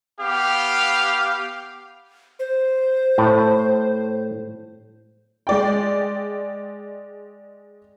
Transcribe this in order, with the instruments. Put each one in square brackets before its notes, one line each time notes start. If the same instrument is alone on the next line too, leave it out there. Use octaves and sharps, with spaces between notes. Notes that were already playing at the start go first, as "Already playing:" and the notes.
[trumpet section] B3 G4 F5
[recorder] C5
[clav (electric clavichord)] A2 A5
[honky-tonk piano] G#3 D5 G5